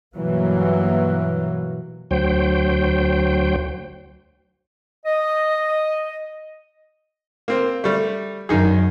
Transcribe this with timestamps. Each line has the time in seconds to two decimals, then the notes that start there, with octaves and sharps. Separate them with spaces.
0.16 G2 B2 E3 F#3 A#3
2.11 D2 F#3 C5 G5
5.06 D#5
7.48 A#3 C4
7.84 G3 A3
8.49 F#2 D#3 D#4 G#4